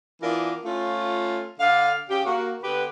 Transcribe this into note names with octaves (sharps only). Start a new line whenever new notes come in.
E3 B3 D4 F4 A#4
A3 C#4 F4
D3 D5 F5
C#3 G4
A#3 F#4
D3 B3 G4 B4